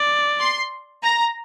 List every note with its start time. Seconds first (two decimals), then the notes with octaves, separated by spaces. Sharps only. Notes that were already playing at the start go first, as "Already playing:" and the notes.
Already playing: D5
0.39 C6
1.02 A#5